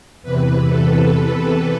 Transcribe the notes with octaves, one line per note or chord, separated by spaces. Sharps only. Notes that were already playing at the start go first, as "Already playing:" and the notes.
E2 C3 E3 B4
A4
B4